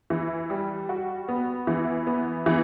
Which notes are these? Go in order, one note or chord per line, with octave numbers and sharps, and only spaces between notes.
E3
G3
F#4
B3
E3
B3
E3